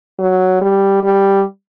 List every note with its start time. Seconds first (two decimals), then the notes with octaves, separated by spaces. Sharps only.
0.19 F#3
0.61 G3
1.03 G3